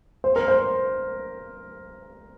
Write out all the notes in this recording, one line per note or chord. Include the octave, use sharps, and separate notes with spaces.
C5
A#4
C5